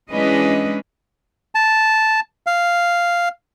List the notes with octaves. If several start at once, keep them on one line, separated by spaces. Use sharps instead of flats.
E3 G#3 C#4 D4 B4 D#5
A5
F5